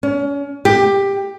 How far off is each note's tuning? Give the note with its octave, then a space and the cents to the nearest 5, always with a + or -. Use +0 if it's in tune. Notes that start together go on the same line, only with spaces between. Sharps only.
C#4 +30
G4 +15